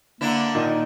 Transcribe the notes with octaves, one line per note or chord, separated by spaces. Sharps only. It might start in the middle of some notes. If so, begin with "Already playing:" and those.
D3 A#3 D4 E4
A#2 D#3 D#4